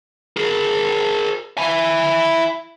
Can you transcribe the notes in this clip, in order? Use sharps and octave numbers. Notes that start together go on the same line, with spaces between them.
G#4 A#4
E4 G#5